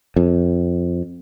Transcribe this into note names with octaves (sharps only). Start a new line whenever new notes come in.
F2